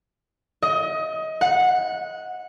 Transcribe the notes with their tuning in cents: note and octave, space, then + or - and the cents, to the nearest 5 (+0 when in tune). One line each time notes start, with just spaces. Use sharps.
D#5 +25
F#5 -15